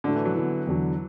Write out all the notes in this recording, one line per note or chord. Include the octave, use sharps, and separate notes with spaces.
A2 D3 A3 D4 F#4
E3
F#3
D3 E3 B3 E4
E2 D3 F#3